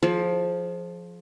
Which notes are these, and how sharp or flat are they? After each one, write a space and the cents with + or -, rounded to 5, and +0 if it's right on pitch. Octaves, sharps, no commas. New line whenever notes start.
F3 +10 G#4 +40 D5 -5